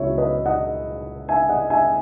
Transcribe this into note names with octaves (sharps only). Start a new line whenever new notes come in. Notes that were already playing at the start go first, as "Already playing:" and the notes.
Already playing: C#2 C#3 F#3 B3 E4 C#5 E5
B4 D#5
D#5 F#5
E5 G#5
D#5 F#5
E5 G#5